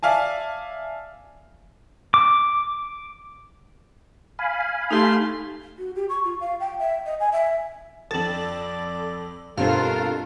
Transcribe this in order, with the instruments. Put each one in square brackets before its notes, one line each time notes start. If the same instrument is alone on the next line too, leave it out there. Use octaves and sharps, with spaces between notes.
[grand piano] D5 E5 F5 G#5 A5
[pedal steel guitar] D6
[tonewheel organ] F5 G#5 B5
[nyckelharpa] A3 C6 [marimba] D#4 G4
[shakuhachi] F#4
G4
C#6
F4
F5
G5
E5
D#5
G#5
E5
[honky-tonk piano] F2 A6 [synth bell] A4 F#7 [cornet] D5
[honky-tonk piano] G2 C4 [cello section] B2 F4 A4 [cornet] A#4 [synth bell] F5